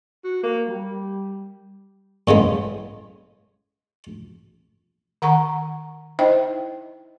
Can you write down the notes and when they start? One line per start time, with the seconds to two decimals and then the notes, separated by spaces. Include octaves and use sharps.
0.24 F#4
0.43 A#3
0.68 G3
2.28 A2 C#3 G#3 B3
5.22 D#3 F#5 A#5 C#6
6.19 D#4 E4 C5 D#5 E5 G5